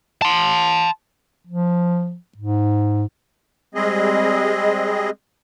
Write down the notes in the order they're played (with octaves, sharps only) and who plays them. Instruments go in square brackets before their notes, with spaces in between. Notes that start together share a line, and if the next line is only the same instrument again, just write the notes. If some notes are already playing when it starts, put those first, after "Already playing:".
[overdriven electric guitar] A5 C6
[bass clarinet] F3
G#2
[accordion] G3 G#3 C4 G#4 D#5